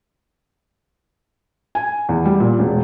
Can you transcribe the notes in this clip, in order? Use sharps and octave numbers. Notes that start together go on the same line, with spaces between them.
G#5
E2
G3
A#2
E1